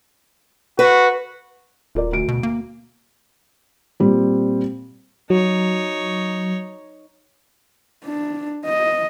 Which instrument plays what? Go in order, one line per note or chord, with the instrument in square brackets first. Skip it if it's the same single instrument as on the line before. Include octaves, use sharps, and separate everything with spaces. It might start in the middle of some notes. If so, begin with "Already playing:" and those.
[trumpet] F#4 [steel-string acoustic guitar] B4
[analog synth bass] D#1 [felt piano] F4 A#4 D5
[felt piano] D2 D7
[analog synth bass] B2
A#3
[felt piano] A#2 G3 C4
[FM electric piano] F#3 [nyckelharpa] D#4 C#5
[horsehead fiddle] D4
D#5